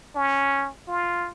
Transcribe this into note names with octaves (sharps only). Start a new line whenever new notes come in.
C#4
F4